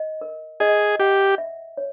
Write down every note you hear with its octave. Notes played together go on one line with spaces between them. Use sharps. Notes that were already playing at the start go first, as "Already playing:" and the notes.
Already playing: D#5
A#4
G#4 D#5
G4 F#5
E5
C#5